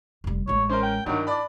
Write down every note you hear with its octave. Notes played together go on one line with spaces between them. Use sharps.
F1 G3
A1 G#3 C#5
C#4 A#4 C5
G5
G2 D#3 F#3 E4
D4 D5 B5